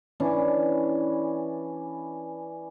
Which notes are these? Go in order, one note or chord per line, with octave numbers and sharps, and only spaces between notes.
E3 C#4 D4